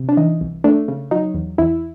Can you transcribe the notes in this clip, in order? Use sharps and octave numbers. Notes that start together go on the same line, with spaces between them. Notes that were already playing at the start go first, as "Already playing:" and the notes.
Already playing: C3
D4
E3 D#4
C2
A3 D4
C#3
F#3 D#4
E2
E2 E4